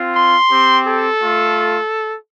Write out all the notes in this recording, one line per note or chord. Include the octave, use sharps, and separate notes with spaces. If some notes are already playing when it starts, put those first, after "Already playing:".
Already playing: C4 F4
C6
C4 G4
A4
A3 F4